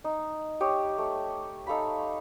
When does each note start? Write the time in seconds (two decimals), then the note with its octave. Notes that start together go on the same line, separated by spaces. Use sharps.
0.04 D#4
0.60 G4 C#5 D#6
0.98 A3
1.67 D#4 A4 F5 B5